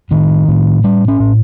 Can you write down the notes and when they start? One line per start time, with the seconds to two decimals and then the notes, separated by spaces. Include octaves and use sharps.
0.11 A2 D#3
0.48 A2
0.84 A2 G3
1.08 C#4
1.20 A2